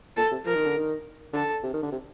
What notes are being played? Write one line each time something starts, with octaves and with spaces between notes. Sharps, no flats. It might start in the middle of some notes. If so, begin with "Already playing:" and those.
A#2 A4
C3
F3 A#4
D#3
D3
D#3
D3 A4
C3
D#3
D3
C3